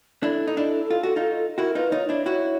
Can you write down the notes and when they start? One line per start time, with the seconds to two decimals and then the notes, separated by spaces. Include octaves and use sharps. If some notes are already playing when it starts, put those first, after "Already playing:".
0.23 D4 E4 A4
0.47 D#4
0.57 D4 E4
0.91 F4
1.03 F#4
1.16 D#4 F4
1.58 E4 F#4 A#4
1.75 D#4 F4 B4
1.92 D#4 F4 C#5
2.09 D4 E4 C#5
2.25 E4 F#4 C#5